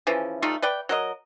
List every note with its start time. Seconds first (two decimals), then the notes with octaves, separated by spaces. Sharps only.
0.07 C#3 E3 F3
0.42 G3 A3 D#4 F4
0.62 B4 D5 G5
0.89 F#3 A#4 D#5